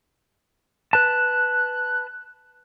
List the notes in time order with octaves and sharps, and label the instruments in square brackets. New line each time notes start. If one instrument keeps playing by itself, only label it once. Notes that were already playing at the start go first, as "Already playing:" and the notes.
[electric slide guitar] B4 A5 [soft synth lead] F#6